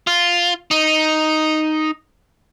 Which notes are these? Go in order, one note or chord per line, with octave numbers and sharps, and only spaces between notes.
F4
D#4